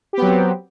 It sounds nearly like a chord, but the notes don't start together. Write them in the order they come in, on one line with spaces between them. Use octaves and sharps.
G4 B3 F#3 C4